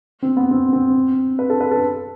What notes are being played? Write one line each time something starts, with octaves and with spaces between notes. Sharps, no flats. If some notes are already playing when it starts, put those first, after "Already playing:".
C4
B3
C4
C4
B4
A4
B4
A4